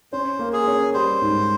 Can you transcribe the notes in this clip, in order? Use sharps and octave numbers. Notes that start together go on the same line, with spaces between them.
C#4 C5
A#3
G#4
C#4
G3 C5
G#2